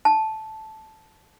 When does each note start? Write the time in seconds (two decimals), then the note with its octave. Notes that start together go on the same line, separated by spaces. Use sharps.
0.05 A5